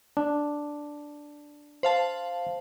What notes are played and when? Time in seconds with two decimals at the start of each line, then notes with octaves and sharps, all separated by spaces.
0.17 D4
1.83 C5 F5 A5